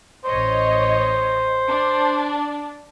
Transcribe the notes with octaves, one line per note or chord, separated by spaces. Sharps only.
A1 C5 C#5 D#5
D4